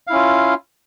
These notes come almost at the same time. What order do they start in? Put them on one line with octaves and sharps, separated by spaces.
F5 E4 C#4 F4